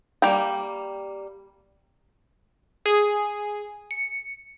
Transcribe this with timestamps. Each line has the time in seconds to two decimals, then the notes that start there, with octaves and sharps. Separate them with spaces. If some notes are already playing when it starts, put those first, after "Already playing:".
0.22 G3 A#3 G5
2.86 G#4
3.91 C#7